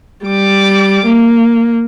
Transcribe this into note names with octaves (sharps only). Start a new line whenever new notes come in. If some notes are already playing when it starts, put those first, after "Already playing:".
G3 D6
A#3